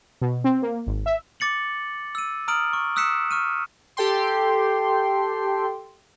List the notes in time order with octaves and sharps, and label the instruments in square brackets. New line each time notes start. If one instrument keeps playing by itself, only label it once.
[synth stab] B2
C4
A#3
G#1
E5
[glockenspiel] D6 A6 C#7 F#7
E6 D#7
A#5 D#6 F6 D7 F#7
C#6
D#6 E6 F#6 B6 C#7 E7
C#6 F6 D#7
[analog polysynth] G4 A4 G5 C6